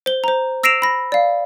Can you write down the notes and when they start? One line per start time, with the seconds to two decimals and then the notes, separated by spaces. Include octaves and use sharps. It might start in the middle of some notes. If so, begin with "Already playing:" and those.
0.06 C5 G7
0.24 C5 A#5
0.63 E6 A#6 C7 D7 E7 F7
0.82 B5 A#6
1.12 D5 F5